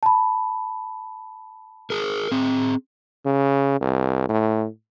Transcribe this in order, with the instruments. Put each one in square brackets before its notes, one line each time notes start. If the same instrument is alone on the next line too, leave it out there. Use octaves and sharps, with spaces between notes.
[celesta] A5 B5
[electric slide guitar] G#4 A#4
C4 G#4
[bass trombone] C#3
C2
A2